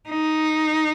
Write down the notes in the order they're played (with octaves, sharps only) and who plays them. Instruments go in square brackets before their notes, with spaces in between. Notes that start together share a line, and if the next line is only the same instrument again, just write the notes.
[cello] D#4